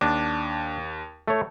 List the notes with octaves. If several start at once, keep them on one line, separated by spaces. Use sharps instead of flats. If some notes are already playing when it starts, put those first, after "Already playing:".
D#2 D4
A3 C#5